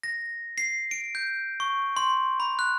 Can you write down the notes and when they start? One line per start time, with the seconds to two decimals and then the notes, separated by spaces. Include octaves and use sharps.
0.03 A#6
0.58 C7
0.91 D7
1.15 G6
1.60 C#6
1.97 C6
2.40 B5
2.59 F#6